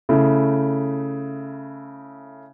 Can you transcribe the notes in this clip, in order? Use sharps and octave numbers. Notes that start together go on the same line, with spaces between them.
C#3 A3 E4